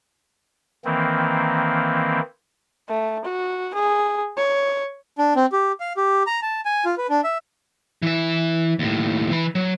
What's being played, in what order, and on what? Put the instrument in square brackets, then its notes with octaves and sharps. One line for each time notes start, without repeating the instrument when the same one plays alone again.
[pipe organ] D#3 E3 A#3 C4
[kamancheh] A3
F#4
G#4
C#5
[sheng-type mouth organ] D4
C4
G4
F5
G4
A#5
A5
G#5
F4
B4
D4
E5
[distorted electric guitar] E3 E5
D#2 A2
E3 B5
F#3